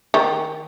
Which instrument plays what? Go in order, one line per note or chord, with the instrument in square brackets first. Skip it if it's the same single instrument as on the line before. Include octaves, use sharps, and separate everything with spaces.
[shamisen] D#3